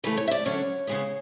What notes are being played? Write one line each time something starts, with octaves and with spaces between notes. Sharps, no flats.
C#3 E3 A3 B4
C#5
E5
D5
D3 F#3 C#4 C#5
C#3 G#3 B3